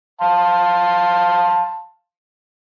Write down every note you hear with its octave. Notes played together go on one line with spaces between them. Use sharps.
F5 A5 C6